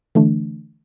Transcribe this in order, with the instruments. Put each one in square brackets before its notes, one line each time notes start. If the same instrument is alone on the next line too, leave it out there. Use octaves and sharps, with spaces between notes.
[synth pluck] D3 E3 A3 D4